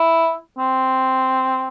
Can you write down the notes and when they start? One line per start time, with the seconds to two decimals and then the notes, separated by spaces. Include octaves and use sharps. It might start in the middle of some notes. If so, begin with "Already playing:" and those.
Already playing: E4
0.58 C4